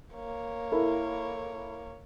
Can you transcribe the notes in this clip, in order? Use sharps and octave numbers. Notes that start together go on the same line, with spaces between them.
A#3 C#5
E4 A4 A#4